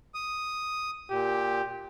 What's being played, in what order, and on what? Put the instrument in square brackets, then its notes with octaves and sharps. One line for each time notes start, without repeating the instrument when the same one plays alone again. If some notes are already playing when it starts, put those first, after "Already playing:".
[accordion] D#6
[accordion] A#2 [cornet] G4